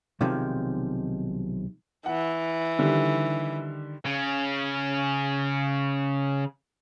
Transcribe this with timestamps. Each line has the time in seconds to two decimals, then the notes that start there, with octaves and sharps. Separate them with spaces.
0.21 B1 C3 D#3 F3 G#3
2.06 E3 F#5
2.79 D3 D#3 G3
4.06 C#3 C#4